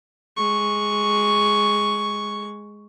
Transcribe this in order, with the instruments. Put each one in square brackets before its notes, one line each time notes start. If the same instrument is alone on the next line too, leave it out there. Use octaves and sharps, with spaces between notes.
[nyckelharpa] G#3 C#6